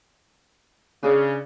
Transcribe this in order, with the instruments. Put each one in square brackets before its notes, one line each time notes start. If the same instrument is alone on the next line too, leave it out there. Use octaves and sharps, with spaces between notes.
[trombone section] C#3 [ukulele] D4 G#4 D5